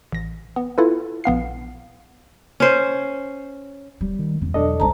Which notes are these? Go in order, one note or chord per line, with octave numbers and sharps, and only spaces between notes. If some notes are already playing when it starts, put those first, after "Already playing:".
A1 A#6
B3
E4 F4 A4 B4
A#1 B3 F5 C7
C#4 C5
D#1 G3
D#3
E2 C#3
B1 E2 D4 A4 D#5
F#1 C2 C5 A5 A#5